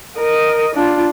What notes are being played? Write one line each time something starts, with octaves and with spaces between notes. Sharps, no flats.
A#4 D#5
D4 F4